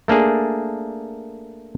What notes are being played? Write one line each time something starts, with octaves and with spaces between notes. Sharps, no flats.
A3 A#3 D4 G#4